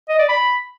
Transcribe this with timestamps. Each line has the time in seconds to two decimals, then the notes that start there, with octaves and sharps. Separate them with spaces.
0.09 D#5
0.19 D5
0.29 B5